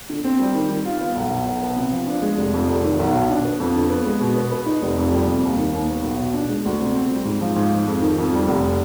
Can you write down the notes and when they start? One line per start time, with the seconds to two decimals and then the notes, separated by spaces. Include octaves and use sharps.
0.10 D3
0.24 C4
0.39 G3
0.55 D#3
0.70 G3
0.85 F4
1.01 B3
1.16 B1
1.31 B2
1.47 B1
1.62 B3
1.76 C3
1.92 F3
2.07 D4
2.22 G#3
2.38 F1
2.54 F2
2.68 F1
2.84 D#3
3.00 B1
3.14 B2
3.30 D4
3.45 B3
3.60 F2
3.76 D3
3.90 B3
4.06 G#3
4.20 B2
4.36 B3
4.52 B4
4.66 D#4
4.82 F1
4.98 F2
5.12 G3
5.27 C3
5.43 D#2
5.58 D#3
5.74 D#2
5.88 B3
6.03 B1
6.20 B2
6.34 D4
6.49 G#3
6.65 D2
6.80 C3
6.95 C4
7.10 G3
7.25 G#2
7.41 F3
7.56 G#2
7.72 G#3
7.87 F2
8.02 D#3
8.18 F2
8.33 G3
8.48 F1